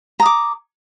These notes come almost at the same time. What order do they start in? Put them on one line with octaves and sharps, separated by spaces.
A#5 D#6 D6